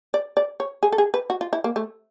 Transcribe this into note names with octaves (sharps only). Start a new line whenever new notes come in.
D5
D5
C#5
G#4
A4
G#4
B4
F#4
F4
E4
A#3
A3